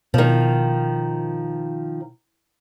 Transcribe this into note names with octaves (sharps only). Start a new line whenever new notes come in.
B2 D#3 F3